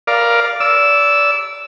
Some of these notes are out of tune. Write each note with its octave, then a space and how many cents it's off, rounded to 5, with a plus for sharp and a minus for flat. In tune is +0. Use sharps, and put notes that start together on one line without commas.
A#4 +15 D5 +0 F5 -5
D5 -25 E6 +0